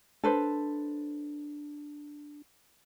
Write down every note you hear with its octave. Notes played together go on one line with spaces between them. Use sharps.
D4 A4 B4 C5